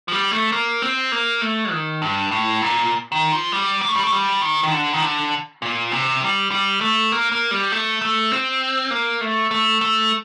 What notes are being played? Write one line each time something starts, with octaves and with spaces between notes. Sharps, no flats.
F3
G3
A3
A#3
C4
A#3
A3
D#3
G2
A2
A#2
D#3
F3
G3
A#3
A3
G3
A3
G3
D#3
D#3
D3
D#3
D3
A#2
C3
G3
G3
A3
A#3
A#3
G3
A3
A3
C4
A#3
A3
A3
A3